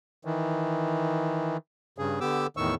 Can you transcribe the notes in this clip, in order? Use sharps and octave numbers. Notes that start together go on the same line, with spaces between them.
D#3 E3
G2 C#3 G#4
D3 B3 G4 D6 E6
E2 A2 D#3 C#6 E6